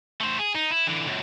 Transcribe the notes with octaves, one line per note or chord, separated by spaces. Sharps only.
A3 C5
G#4
D#4
E4
D3 E3
C#2 F#2